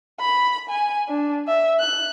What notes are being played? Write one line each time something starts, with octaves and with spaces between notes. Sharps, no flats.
B5
G#5
D4
E5
F#6